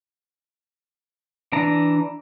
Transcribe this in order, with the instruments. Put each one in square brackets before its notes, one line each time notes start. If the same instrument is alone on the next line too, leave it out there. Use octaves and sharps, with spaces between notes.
[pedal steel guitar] E3 D4 A#5